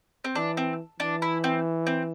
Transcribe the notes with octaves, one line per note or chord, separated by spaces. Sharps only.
C4
E3 D4
C4
E3 D4
E4
C4
C4